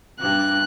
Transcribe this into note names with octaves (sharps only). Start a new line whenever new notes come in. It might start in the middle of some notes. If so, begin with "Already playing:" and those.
G2 F#6